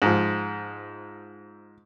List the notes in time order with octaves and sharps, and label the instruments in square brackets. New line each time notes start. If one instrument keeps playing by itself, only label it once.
[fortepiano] G#2 F3